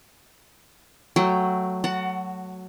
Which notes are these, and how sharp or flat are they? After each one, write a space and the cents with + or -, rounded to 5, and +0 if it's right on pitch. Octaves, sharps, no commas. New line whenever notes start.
F#3 +0 A3 +0 G5 +0
F#4 +0 F#5 +20 A5 +30